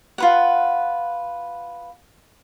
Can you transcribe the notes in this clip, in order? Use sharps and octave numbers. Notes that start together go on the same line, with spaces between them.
F4 B4 F#5